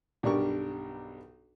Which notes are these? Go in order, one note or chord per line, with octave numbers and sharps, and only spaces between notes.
B1 G2 D4 G4 A#4 C#6